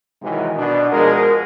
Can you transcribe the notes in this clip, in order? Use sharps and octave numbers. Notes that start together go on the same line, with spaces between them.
G#2 C3 D#3 E3 F#3 G#3
B2 D4
B2 F3 G#3 G#4 A#4